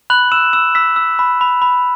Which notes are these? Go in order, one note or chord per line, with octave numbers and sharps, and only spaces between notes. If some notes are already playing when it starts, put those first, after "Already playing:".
B5 F#6 F#7
E6 E7
E6 E7
E6 B6
E6
B5
B5
B5